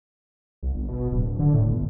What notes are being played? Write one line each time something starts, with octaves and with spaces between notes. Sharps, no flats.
C2
G1
B2
D1
D3
A2
G1